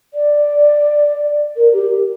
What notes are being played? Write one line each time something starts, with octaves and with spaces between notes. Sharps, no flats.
D5
A#4
G4